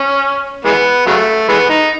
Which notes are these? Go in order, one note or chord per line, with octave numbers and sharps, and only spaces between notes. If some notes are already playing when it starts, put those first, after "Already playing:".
Already playing: C#4
E3 G#3 B3
C#3 F#3 A3
E3 G#3 B3
D#4